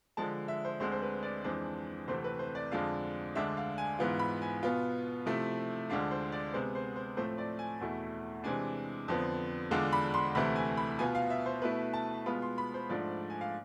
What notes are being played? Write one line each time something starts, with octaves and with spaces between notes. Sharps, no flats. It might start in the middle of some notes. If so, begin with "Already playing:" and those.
D3 F3 G#3 A5
E5
C5
D2 D3 G#3 C4 C5
C5
B4
D5
F2 E3 G#3 D4 C5
D2 C3 E3 A3 C4 C5
B4
C5
D5
F2 D3 G#3 D4 F4 F5
D2 D3 G#3 D4 E5
F5
G#5
G#2 E3 B3 F4
B5
G#5
B2 B3 F4
C3 F3 A3 E4
D2 D3 G#3 D4 F4 F5
C5
D5
C3 G#3 B3 C5
C5
C5
A2 F3 A3 C4 C5
D5
G#5
E2 B2 A3 E4
C3 E3 G#3 D4 G#5
F2 D3 F3 B3
E2 D3 G#3 D4 F4
B5
C6
D2 C3 E3 A3 E4 B5
G#5
B5
B2 B3 F4 G#5
F5
E5
C5
B2 A3 E4 B4
A5
B2 G#3 B3 F4 B5
C6
B5
C5
G#2 F3 A3 D4 D5
G#5
F5